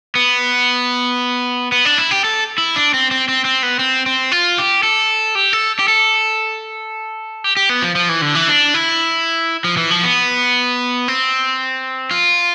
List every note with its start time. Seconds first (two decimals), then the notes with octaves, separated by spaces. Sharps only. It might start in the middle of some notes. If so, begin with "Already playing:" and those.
0.15 B3
1.72 B3
1.85 D4
1.98 E4
2.11 G4
2.24 A4
2.58 E4
2.76 D4
2.94 C4
3.11 C4
3.28 C4
3.45 C4
3.63 B3
3.79 C4
4.06 C4
4.32 F4
4.58 G4
4.83 A4
5.35 G4
5.53 A4
5.79 G4
5.88 A4
7.44 G4
7.57 G4
7.69 B3
7.83 F3
7.96 F3
8.09 E3
8.22 D3
8.35 E3
8.48 D4
8.74 E4
9.64 F3
9.77 E3
9.90 F3
10.04 B3
11.08 C4
12.11 F4